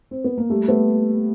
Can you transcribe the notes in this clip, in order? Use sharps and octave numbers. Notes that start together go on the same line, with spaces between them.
C4
B3
A#3
G3 A3
A3 B3